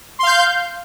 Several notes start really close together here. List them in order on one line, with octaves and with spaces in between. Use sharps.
C6 F5 G6